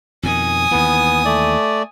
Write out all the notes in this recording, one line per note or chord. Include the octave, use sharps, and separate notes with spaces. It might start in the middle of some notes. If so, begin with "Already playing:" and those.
F2 B2 D#3 G#5 D#6
D#2 E3 B3
A3 D5